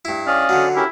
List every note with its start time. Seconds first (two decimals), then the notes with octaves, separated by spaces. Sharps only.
0.05 G2 E4
0.27 C#4 D5 D#5 F5
0.49 D3 F#3
0.76 C#4 E4 G4 A#4